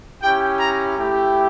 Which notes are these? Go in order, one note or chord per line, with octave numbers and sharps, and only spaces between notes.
C#4 E4 G4 G5
A#5
A3 E4 G4